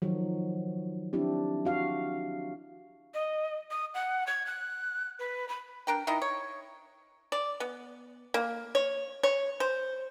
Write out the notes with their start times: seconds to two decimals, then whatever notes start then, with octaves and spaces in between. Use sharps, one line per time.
0.02 D#3 F3 F#3
1.13 C4 D4 E4 G4
1.65 F#4 F5
3.14 D#5
3.71 D#6
3.94 F#5
4.27 G#6
4.46 F#6
5.19 B4
5.49 B5
5.87 D4 A#4 G5
6.07 D#3 D#4 E4 D#5
6.22 C#5
7.32 D5
7.60 B3
8.34 A#3
8.75 C#5
9.23 C#5
9.60 C5